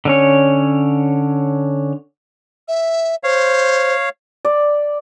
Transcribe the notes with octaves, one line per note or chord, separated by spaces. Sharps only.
D3 C#4 C#5
E5
C5 C#5 F5
D5